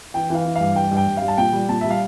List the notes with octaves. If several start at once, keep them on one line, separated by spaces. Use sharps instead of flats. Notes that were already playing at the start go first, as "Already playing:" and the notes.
E3 G5
E3 F5
E3
F5
G2
G2 G5
G2
G5
G2
G3 F5
A5
A#2 G5
G3
A#2 A5
G3 E5
F5